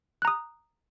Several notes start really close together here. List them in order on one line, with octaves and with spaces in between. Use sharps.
F#6 A#5 D#6